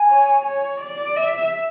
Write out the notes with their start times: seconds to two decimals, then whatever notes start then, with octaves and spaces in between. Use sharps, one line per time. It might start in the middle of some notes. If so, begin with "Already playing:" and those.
Already playing: G#5
0.09 C#5
0.45 C#5
0.81 D5
1.16 E5